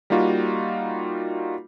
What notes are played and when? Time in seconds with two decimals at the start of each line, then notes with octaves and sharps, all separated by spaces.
0.10 G3 A#3 D#4 F4 F#4